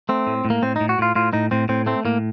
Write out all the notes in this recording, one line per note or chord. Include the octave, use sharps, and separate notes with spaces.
A3 C4
A2
A2
A#3
A2 C4
D#4
A2
F#4
A2 F4
A2 F4
A2 D#4
A2 C4
A2 C4
A3 C4
A2 A#3